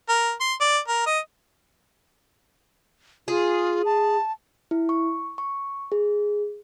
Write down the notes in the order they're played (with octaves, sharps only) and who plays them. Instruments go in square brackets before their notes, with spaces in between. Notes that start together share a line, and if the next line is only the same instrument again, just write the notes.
[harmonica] A#4
C6
D5
A#4
D#5
[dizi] F4 [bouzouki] G#4
[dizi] A5
[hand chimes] E4
C#6
C#6
G#4